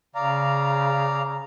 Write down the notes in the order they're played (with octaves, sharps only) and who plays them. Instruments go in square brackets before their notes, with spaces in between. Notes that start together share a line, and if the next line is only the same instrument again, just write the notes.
[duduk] C#3 [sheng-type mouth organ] D5 F5 A#5